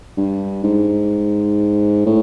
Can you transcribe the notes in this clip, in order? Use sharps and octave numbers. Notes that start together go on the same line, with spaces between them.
G2
G#2
A2